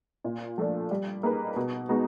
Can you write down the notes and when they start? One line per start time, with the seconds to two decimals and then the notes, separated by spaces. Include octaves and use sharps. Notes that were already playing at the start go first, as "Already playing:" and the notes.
0.24 A#2
0.58 F3 A3 D4
0.91 G3
1.23 A#3 D#4 G#4 B4
1.56 B2
1.89 G#3 B3 D#4 F#4